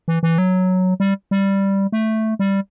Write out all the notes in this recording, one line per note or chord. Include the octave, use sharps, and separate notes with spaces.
E3
E3
F#3
G3
G3
A3
G3